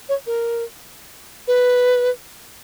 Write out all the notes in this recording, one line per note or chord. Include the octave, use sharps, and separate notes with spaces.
C#5
A#4
B4